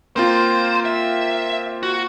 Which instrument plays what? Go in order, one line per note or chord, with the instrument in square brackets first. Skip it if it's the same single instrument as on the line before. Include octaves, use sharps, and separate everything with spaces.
[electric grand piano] A#3 C4 F4 [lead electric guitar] C5
[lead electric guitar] E5
F#4